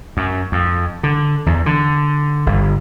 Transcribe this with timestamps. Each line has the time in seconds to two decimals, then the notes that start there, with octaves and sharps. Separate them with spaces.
0.17 F#2
0.52 F2
1.03 D3
1.46 E2
1.66 D3
2.46 G1